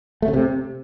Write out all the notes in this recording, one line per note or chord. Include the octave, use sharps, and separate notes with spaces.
A3
C#3
C3